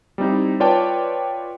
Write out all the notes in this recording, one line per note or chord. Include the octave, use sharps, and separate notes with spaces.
G3 C4 D#4 E4
F4 B4 C#5 D5 G5 A5